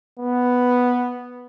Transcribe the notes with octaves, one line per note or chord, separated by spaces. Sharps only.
B3